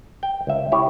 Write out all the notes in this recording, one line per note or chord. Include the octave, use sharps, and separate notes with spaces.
G5
C#2 E5
E4 G4 C#5